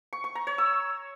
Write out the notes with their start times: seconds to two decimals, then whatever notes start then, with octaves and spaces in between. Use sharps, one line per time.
0.13 C#6
0.24 C#6
0.35 A#5
0.47 C#5
0.58 E6